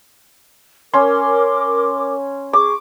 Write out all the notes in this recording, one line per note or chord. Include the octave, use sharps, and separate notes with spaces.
C#4 A#4 C6 D6
G#4 C#6 D6